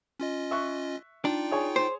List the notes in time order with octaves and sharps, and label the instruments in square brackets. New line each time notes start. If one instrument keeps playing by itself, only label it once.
[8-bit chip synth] C#4 F4 D#5
[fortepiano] E5 C#6 F#6
[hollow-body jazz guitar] D4 [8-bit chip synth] D#4 F4 G5
[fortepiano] G#4 C#5 G#5
[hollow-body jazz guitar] C5